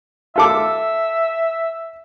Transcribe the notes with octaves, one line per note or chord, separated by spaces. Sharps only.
F4 A4 E5 D6